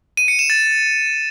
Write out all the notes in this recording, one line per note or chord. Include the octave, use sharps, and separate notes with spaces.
D#7
C#7
E7
A6